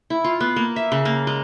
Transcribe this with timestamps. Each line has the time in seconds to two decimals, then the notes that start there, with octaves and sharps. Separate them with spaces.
0.10 E4
0.24 F4
0.40 B3
0.56 A#3
0.76 E5
0.92 C#3
1.05 A#3
1.27 G#3